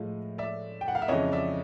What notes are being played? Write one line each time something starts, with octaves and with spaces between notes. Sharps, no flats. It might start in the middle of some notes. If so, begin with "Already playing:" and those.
Already playing: A2 F3 G#3 D#5 F5
D5 E5
G5
F#5
F5
E5
F2 C#3 E3 G#3 C#5 D#5
D5 E5